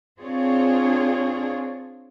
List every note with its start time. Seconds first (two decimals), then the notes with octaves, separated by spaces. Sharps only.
0.19 C4 D4 F4 G#4 C#5